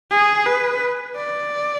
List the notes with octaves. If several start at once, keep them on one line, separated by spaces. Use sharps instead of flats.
G#4
B4
D5